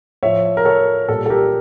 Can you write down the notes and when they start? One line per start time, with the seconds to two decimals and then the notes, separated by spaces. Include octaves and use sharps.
0.23 A2 F3 C#5 E5
0.57 A#4
0.65 A4 C#5
1.09 A#2 G3 A4
1.26 A4
1.30 G4 A#4